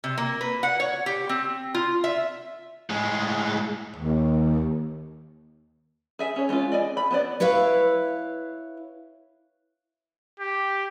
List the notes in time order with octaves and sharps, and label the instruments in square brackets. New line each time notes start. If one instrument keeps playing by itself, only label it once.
[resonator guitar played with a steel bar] C3
A#3
B4
F#5
C#5
G4
C4
F4
E5
[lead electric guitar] A2 G#3
[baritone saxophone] D#2
[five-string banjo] G#4 E5 G#5
C#4 C#5
G#3 B3 C#4 F4
D5 D#5 G#5
B5
B3 C5 D5
[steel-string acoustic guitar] E4 B4 C#5 E5 F5
[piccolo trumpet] G4